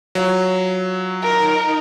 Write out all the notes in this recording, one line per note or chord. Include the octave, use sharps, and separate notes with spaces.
F#3 F4 F5
D#4 A#4